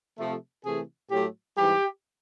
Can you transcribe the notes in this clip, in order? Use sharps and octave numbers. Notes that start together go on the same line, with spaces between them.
C3 F3 A3
C3 E3 A3 G#4
A2 F#3 A3 G4
G#2 E3 G3 G4